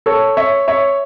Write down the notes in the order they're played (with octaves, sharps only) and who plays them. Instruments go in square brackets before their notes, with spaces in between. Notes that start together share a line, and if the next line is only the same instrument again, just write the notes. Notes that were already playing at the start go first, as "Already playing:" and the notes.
[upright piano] A4 C#5
C#5 E5
C#5 E5